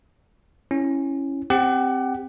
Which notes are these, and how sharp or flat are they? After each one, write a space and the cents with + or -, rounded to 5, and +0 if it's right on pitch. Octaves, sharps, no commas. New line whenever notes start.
C#4 -10 E4 +0
C4 +0 G4 +10 F#5 +30